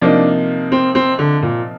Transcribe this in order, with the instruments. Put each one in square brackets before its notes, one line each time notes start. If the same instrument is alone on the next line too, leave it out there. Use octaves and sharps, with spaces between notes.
[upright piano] C3 F3 A#3 D#4 [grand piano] D4
[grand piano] C4
C4
D3
A#2